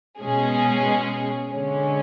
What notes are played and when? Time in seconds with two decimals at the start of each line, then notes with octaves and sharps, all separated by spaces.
0.19 B2 G#3 C#4 G#4
1.50 D3 G#3 C#4